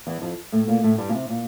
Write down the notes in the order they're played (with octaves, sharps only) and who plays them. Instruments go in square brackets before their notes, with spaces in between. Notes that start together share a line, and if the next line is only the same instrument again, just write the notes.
[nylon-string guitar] E2 E3
F2 F3
A2 A3
A#2 A#3
A2 A3
G2 G3
A#2
C3
A#2